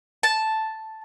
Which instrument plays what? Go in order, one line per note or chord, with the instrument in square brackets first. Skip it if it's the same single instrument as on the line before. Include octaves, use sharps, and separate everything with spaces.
[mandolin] A5